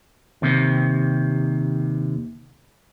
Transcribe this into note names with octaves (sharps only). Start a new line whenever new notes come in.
D#2 C3